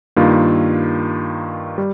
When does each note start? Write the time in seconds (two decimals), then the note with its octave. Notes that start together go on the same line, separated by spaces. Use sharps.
0.16 G2 D#3 A#3 F4
1.78 G3